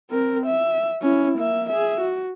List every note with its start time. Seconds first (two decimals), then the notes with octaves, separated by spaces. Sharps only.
0.10 C4 A#4
0.46 E5
1.02 C#4 E4
1.38 A#3 E5
1.69 G#4 E5
2.01 F#4